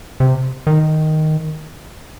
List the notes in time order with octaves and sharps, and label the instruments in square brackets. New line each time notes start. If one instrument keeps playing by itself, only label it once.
[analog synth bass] C3
D#3